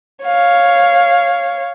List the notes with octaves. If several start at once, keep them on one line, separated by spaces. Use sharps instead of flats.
C#5 F5